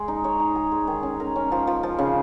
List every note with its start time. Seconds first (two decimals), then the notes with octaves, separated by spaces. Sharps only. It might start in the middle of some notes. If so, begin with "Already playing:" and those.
Already playing: G#3
0.08 D#4
0.24 C#5
0.40 D#4
0.56 G#4
0.72 G#3
0.87 D#3
1.03 C#4
1.20 A#4
1.36 C#4
1.52 F3
1.67 F3
1.83 F3
1.99 C#3